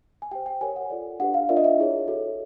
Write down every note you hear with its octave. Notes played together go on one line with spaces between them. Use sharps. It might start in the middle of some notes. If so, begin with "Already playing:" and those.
G#5
G4 C5 G5
G5
G4 A#4 C#5 G#5
F#5
F4 A4 D5
D4 G4 B4 F#5
F5
D4 F4 A#4 D5 E5
D#5
E5
E4 G#4 C#5
F#4 A4 C#5